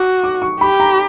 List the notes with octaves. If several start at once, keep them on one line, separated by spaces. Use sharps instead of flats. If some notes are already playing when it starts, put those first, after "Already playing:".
Already playing: F#4 D6
D6
C#6
G4 B5
A#5